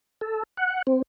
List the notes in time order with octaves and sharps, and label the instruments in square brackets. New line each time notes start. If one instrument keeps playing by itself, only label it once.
[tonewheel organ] A4
F#5
C4